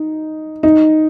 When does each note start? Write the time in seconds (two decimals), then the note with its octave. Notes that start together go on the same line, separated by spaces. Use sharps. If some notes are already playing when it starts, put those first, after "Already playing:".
Already playing: D#4
0.63 D#4